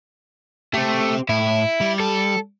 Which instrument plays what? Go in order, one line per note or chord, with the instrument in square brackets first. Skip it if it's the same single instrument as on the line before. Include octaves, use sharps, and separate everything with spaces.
[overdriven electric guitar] A3 [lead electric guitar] C4 G4
[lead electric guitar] A2 [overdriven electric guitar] E4
[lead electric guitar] G3
[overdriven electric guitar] A4